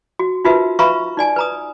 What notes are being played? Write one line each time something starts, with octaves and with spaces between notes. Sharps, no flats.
F#4
D#4 F4 F#4 A#4 B4 E5
B4 E5 F5 A#5 B5 C#6
D#4 D5 G#5
B4 A#5 D#6